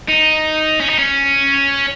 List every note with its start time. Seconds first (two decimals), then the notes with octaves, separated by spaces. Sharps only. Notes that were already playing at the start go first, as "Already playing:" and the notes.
0.09 D#4
0.80 C#4
0.89 D#4
0.98 C#4